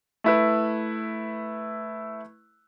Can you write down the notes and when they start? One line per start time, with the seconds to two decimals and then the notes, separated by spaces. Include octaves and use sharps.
0.24 A3 E4 B4